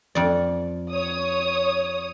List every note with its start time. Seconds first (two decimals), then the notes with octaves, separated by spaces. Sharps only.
0.15 F2 D5
0.93 C#5 D#6